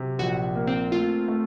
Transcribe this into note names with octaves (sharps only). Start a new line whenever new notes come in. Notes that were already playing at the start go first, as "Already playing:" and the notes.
Already playing: C3 F#3
A#1 F#4
A#3
C4
A3 F4
A3